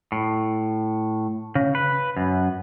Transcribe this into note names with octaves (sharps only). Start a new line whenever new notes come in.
A2
C#3
B4
F#2